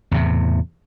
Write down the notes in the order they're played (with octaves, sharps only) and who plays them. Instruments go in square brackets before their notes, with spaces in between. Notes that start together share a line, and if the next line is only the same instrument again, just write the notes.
[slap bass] E2 A2 C3